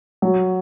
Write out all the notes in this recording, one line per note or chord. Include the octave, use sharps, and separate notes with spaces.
F#3